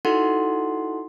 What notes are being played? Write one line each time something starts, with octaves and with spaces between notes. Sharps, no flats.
D#4 E4 F#4 A4 F#5 C6